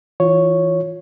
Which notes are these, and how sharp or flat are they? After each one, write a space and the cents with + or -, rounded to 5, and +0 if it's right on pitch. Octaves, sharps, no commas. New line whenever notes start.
E3 +0 F4 +20 C#5 +0